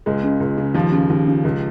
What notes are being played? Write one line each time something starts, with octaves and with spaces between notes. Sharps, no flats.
C#2 G#3
C#3
C#2
C#3
D#2 F3
C#3
D#2
C#3
C#2